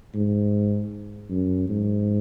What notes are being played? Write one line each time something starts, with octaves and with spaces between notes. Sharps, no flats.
G#2
F#2
G#2